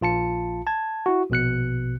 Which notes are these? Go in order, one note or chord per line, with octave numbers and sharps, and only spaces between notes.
A#1 F4 A5 C#7
A5 G#6
E4 F#4
A#1 B2 F#6 C#7